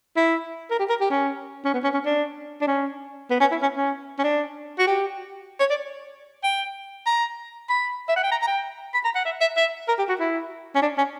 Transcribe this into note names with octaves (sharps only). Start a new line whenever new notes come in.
E4
A#4
G4
A#4
G4
C#4
C#4
B3
C#4
C#4
D4
D4
C#4
B3
C#4
E4
C#4
C#4
C#4
D4
F#4
G4
C#5
D5
G5
A#5
B5
E5
F#5
G5
A#5
A#5
G5
B5
A#5
F#5
E5
E5
E5
A#4
G4
F#4
E4
C#4
D4
C#4